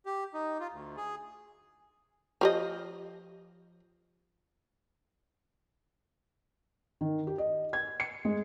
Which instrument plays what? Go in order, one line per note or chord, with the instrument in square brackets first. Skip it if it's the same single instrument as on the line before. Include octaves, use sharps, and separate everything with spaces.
[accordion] G4
D#4
F4
D2
G#4
[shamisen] F3 G4 D#5
[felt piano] D#3
G4
D#5
G#6
C#7
G#3